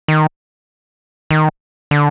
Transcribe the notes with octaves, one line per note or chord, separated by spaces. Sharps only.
D#3
D#3
D3